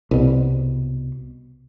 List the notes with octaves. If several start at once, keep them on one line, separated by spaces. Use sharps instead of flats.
C2 B2